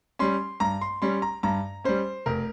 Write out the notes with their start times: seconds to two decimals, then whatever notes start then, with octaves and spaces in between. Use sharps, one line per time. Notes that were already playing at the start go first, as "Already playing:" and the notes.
0.19 G3 C#4 C6
0.60 G2 A#5
0.81 C6
1.02 G3 C#4 C6
1.22 A#5
1.43 G2 A#5
1.84 G3 C#4 C5
2.26 F1 A#4